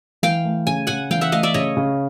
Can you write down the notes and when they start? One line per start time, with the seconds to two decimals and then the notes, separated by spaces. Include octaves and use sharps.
0.23 E3 F5 G5
0.45 A3
0.67 C#3 G#5
0.87 C#3 F#5 G#5
1.11 E3 F5 G5
1.21 E5 F#5
1.32 A3 D#5 F5
1.43 D5 E5
1.54 C#3 C#5 D#5
1.77 C#3